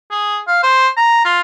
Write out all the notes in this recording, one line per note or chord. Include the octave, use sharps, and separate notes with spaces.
G#4
F5
C5
A#5
F4